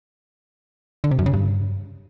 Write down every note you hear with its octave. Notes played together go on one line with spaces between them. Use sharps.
D3
C3
F#2
C#3
G2